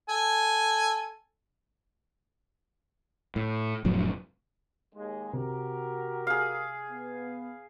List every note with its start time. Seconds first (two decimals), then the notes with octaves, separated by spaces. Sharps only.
0.09 A4 G#5
3.36 A2
3.85 F1 F2 A2 F#3
4.94 D#2 G#3
5.33 C3 F#4 G4 A#4
6.27 G#4 F5
6.90 B3